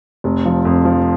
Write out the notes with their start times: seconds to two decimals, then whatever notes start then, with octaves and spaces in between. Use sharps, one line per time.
0.24 F1
0.45 F3
0.65 F2
0.85 F3